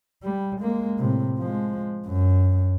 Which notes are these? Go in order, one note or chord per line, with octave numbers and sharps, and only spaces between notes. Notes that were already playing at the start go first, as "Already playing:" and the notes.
G3
G#3 A#3
A2 C3
F3 G#3
F#2